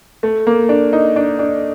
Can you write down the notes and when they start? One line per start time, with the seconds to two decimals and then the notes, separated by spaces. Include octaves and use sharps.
0.23 A3
0.47 A#3
0.69 D4
0.93 D#4
1.16 D4
1.39 D4